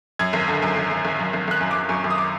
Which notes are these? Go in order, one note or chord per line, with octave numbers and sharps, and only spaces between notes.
F#2 G#6
G#1
D3
F#2
G#1
G#1
G#1
F#2
G#1
G#1 F#6
F#2
F#2 D6
F#2 C#6
F#2
D#6
D6